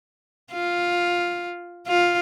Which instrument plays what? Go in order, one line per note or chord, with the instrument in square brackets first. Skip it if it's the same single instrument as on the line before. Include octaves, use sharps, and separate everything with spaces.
[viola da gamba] F4
F4